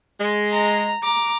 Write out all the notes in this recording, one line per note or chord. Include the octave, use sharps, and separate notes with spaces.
G#3
A#5
A#5 D6